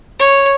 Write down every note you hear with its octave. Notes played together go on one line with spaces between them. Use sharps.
C#5